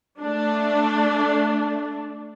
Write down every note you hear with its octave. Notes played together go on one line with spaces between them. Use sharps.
A3 D4